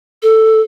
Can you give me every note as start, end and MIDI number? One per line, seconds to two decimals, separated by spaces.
0.23 0.60 69